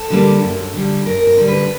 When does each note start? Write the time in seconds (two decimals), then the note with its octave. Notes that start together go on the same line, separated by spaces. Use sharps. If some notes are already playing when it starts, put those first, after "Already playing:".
Already playing: A4
0.10 D3 G3 A#3
0.42 F#2
0.74 D3 G3
1.05 F#2 A#4
1.27 A#4
1.37 D3 G3
1.48 B4